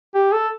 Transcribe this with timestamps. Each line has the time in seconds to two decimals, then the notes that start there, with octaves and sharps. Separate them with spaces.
0.15 G4
0.32 A4